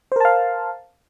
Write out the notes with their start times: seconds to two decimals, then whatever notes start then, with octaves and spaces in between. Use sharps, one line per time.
0.12 C5
0.16 A#4
0.20 A5
0.25 F5